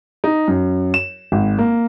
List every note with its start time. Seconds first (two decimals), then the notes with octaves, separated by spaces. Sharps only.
0.24 D#4
0.48 F#2
0.94 E7
1.32 G#1
1.58 A#3